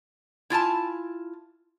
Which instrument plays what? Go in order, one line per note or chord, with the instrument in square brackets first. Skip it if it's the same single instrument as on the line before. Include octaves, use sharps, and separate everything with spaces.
[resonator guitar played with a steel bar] E4 F4 G#5 A5